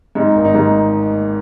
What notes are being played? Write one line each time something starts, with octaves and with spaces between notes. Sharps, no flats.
G#2 D#4
G#1
D#4
G#2